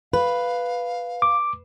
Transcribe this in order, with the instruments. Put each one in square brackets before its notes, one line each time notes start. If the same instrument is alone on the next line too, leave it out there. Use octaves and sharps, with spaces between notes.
[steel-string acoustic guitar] B4 [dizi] F5
[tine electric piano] D6